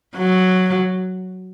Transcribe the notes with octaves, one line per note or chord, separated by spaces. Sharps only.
F#3